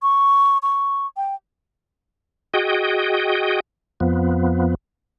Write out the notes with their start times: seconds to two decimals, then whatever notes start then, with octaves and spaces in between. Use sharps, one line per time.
0.02 C#6
0.63 C#6
1.17 G5
2.54 F#4 G#4 D#5 G5
4.00 F2 F3 B3